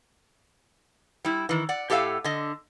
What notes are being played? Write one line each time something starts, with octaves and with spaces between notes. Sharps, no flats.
G3 E4
D#3 E3
D5 F#5
A2 G4 A4 E5 F5
D3 D#5